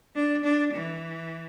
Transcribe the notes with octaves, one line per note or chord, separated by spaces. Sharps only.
D4
D4
E3